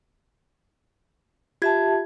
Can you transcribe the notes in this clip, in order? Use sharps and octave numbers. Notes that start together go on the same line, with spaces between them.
F4 G4 E5 A5 G#6